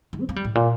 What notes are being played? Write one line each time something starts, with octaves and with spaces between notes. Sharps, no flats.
D#3
C4
A#3
G3
A2
A#2